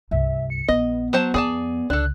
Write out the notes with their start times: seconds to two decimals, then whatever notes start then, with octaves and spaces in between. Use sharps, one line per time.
0.11 C2 G2 E5
0.50 C#7
0.68 A#1 B3 D#5
1.13 F#3 C5 A5
1.34 F2 G#4 D5 A5
1.90 C#2 D3 D4 A4 F#6